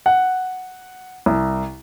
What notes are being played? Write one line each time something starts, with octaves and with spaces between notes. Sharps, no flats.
F#5
C2